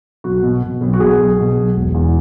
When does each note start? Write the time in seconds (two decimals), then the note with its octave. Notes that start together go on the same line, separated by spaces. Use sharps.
0.24 B1 F#4
0.43 B2
0.63 B2
0.81 B1
0.94 F#4
1.00 B2 G#4
1.19 B1
1.38 B2
1.57 B1
1.76 E1
1.94 E2